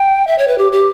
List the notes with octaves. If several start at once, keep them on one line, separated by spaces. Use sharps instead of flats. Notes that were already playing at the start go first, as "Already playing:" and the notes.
Already playing: G5
E5
C#5
B4
G4
G4